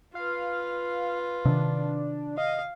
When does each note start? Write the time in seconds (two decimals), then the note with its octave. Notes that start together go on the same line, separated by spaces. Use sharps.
0.15 F4 B4 F5
1.45 C3 D#3 D4
2.38 D#5 F5